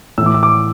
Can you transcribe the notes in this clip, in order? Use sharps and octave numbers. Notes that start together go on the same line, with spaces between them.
A2 E3 E6
D6
E6
D6